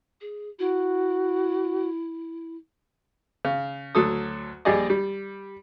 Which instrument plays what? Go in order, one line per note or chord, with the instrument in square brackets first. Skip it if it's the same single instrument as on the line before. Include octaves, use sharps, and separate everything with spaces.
[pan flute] G#4
[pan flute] E4 [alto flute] F#4
[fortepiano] C#3
D2 F#3 A4 D#6
A#1 G3 G4 G#4 D5 D#5
G3